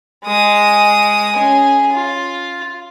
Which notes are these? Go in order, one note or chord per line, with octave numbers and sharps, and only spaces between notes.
G#3 D#6
C#4 G#4
F4